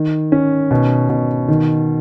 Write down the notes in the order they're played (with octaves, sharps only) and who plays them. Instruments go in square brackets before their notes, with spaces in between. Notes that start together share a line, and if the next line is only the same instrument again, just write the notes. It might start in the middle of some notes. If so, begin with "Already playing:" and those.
Already playing: [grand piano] D#3
C#4
B2
B2
D#3